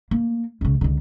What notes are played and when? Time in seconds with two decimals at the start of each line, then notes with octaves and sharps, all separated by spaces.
0.11 A#3
0.61 C#2 C#3
0.81 C#2 D3